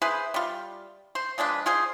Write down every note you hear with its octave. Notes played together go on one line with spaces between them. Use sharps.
E4 G#4 B4 C5
G3 F4
C5
F3 G#3 D4 B4
F4 G#4 C5